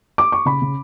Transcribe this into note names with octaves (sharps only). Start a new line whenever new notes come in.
D6
C#6
C#3 B5
C#3